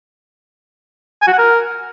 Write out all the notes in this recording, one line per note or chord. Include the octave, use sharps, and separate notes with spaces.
G#5
F#4
F#5
A#4